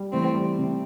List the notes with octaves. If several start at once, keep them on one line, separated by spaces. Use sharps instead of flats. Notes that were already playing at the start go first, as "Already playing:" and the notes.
Already playing: G3
E3 A3 C4
G3
C3